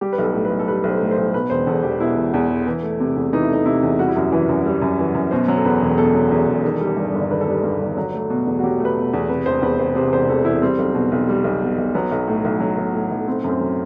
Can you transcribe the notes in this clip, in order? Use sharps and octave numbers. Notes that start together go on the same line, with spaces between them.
G3 G4
B4
B1 A4
A2
B4
B1
A4
G3 B4
B1
C5
A2
C5
B1
B2 B4
E1 C5
E2 A4
E1 G4
B2 E4
E1
E2
E1
E3
A3
C3
E2
E3 D#4
E4
A3 D#4
C3 E4
E2
G3 F#4
E4
F#2 F#4
E3
F#2
G3
F#2
E3
F#2
B2 C5
F#3
A4
E2 B4
E1
B2 A4
F#3
E2
E1
D#3
G3
G2
G1
D#3 B4
A4
G3 B4
G2
G1
F#3
A3
B2
E2
F#4
F#3 G4
A3
B4
B2
E2
C3 B4
E1 C5
E2 B4
E1 C5
C3 C5
E1 C5
E2 A4
E1 E4
G3 C4
B1
B2
B1
G3
B1
B2
B1
F#3 B3
B1
A2
B1
F#3
B1
A2
B1
A3 C4
F#2
C4
F#3